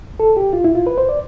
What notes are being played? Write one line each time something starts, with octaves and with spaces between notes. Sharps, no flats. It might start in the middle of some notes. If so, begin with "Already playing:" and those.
A4
G4
F4
E4
F4
B4
C5
D5